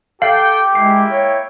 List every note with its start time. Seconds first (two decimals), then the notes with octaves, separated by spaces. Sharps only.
0.22 G4 A4 F5 G5
0.75 G#3 A#3 E4 G5 C7
1.11 C#5